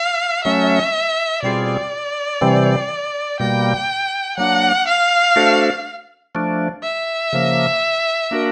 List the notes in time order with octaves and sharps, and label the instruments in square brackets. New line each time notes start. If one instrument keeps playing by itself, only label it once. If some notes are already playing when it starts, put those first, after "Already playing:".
Already playing: [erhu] F5
[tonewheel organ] F#3 A3 C#4 [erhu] E5
[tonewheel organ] B2 G3 C4 F4 G#4 [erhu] D5
[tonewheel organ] C3 E3 G3 C4
[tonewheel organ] B2 G3 A#3 [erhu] G5
[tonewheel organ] F#3 A#3 D4 [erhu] F#5
[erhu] F5
[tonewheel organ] A3 D4 F#4 A4 C5
F3 A3 D4
[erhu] E5
[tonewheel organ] C#3 F3 A#3
A#3 D4 F#4 A#4